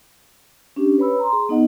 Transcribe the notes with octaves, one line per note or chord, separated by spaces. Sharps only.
C#4 D4 G4
B4 C#5 B5 E6
A#5 C6
G#4
B3 D#4 D#5 F#5